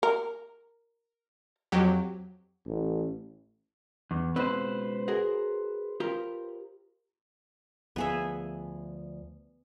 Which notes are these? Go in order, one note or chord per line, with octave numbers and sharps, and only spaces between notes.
A#4
F2 F#3 G4
A1
E2
C#2 B2 C4 B4 C5
F#4 G#4 A#4
F4 G4 A#4
D2 F3 B3 G#4 E5